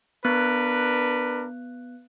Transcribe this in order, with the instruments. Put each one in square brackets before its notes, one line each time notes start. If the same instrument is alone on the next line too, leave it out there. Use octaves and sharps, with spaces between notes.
[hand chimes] B3 F#6 [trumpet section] D4 A#4 B4